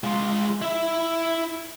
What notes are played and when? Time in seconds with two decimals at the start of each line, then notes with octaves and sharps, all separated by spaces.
0.04 G#3 F4
0.62 E4 E5